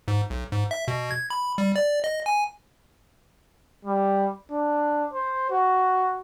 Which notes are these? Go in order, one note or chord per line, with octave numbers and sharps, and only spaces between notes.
G#2
B1
G#2
E5
B2
G#6
B5
G3
D5
D#5
G#5
G3
D4
C5
F#4